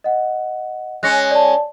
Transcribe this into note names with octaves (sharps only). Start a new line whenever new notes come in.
D#5 F#5
G#3 C#4 F#6 A#6 C#7
D5 A5